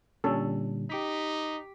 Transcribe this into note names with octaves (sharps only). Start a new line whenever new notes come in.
A#2 D3 G3 C#4 A4
D#4 G4 D6 B6